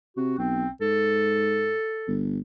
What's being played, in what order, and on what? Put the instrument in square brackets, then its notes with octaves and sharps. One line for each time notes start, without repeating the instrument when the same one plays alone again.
[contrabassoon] C3 [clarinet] F#4
[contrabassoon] B1 [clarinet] C4
[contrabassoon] G#2 [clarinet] A4
[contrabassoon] G1